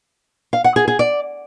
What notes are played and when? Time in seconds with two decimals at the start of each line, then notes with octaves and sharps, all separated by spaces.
0.53 F5
0.64 F#5
0.76 G#4
0.88 G#4
0.99 D5